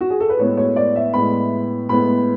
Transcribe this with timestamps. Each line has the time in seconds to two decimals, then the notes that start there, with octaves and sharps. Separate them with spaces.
0.01 F#4
0.10 G#4
0.20 A4
0.29 B4
0.39 A2 G#3 B3 C#5
0.57 C#5
0.76 D5
0.96 E5
1.14 A2 G#3 B3 B5
1.89 A2 G#3 B3 B5